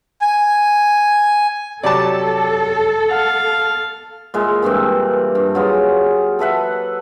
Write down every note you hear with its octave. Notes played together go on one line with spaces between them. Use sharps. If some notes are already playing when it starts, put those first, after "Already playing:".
G#5
C3 F#3 G4 A4 D5 A5
F5 F#5
A#2 G#3 E4
G2 A#2 E3 C4
G2
F#3 F4 G#4
A4 B4 E5 F#5